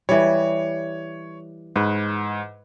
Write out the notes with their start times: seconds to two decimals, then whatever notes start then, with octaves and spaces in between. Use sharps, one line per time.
0.09 E3 G3 C#5
1.76 G#2 B4